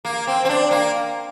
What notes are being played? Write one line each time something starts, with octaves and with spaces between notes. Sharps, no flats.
A#3
C4
C4
D4
A#3